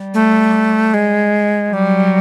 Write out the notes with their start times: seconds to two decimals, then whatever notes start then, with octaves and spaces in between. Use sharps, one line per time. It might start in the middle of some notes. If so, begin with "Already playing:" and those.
Already playing: G3
0.14 A3
0.94 G#3
1.73 F#3 G3